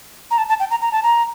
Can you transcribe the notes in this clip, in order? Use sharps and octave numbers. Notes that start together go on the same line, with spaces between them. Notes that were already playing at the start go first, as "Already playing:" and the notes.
A#5
A5
A5
G5
A#5
A#5
A5
A#5